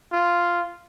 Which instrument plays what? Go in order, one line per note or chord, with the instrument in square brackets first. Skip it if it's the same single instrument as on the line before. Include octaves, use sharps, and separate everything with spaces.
[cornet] F4